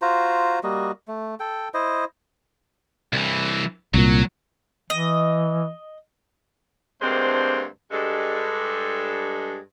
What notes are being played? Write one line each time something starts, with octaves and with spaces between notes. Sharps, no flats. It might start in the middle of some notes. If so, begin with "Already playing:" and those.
F4 F#4 C5 A#5
G3 A#3 F#4 D#5
A3
A4 G5
E4 C5 D#5
C2 E3
C2 A#2 F#3
E3 D#5
D2 G2 G#3 A#3 C4 C5
G2 G#3 A4